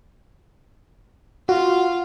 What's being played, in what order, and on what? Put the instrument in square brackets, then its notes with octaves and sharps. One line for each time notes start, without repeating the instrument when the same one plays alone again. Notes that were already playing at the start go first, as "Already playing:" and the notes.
[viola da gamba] F4 [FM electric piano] F#4